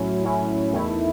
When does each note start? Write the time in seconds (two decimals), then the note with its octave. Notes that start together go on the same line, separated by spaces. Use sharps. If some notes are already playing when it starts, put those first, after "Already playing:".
Already playing: A2 F#3 C#4 E4
0.24 A2 F#3 C#4 E4
0.73 E2 D#3 A3 E4